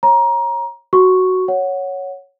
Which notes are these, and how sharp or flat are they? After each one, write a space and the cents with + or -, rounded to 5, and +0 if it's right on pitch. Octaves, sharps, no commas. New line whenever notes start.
C#5 -25 A#5 +20
F#4 +5 C#6 +0
C#5 +0 F#5 -5